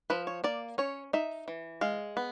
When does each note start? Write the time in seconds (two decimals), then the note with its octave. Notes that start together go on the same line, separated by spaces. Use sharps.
0.10 F3 B4
0.27 C#5
0.44 A#3 D5
0.78 C#4 C#5
1.13 D#4 E5
1.48 E3
1.81 G#3 F5
2.17 B3